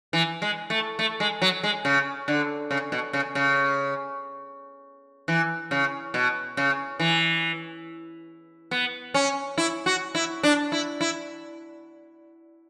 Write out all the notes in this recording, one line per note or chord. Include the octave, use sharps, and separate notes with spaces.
E3
G#3
A3
A3
G#3
F#3
G#3
C#3
D3
C#3
B2
C#3
C#3
E3
C#3
B2
C#3
E3
B3
C#4
E4
F#4
E4
D4
E4
E4